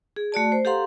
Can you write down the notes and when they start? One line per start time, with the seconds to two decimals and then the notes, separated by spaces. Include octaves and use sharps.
0.16 G#4
0.32 A3 F#4 D5 A5
0.52 C5
0.65 G4 A4 F5 F#5 A#5 C6